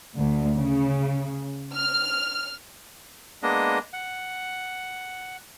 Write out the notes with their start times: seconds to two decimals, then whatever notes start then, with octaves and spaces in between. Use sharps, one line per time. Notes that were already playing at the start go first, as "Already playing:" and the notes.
0.16 D2
0.59 C#3
1.75 F6
3.43 G#3 A#3 B3 D4 D#5
3.93 F#5